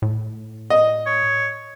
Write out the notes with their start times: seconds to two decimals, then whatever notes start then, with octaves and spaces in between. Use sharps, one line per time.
0.02 A2
0.70 D#5
1.06 C#5